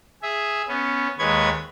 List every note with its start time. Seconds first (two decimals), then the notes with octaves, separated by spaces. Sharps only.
0.23 G#4 E5
0.68 B3 C#4
1.19 D#2 G#3 B4 C#5 G#6